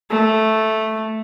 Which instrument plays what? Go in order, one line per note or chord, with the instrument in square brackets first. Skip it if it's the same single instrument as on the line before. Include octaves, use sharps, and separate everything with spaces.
[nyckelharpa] A3